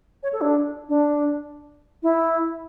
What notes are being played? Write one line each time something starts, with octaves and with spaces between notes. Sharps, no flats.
C#5
A4
D4
D4
E4